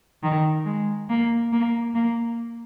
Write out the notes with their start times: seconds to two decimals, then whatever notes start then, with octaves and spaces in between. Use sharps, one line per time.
0.23 D#3
0.65 G#3
1.09 A#3
1.52 A#3
1.95 A#3